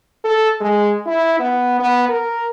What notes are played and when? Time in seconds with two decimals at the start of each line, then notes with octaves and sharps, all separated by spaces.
0.24 A4
0.61 G#3
1.06 E4
1.39 B3
1.80 B3
2.09 A#4